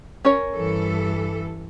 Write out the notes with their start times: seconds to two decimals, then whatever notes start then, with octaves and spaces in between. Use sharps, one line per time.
0.25 C#4 A#4 C#5
0.54 G2 E3 A4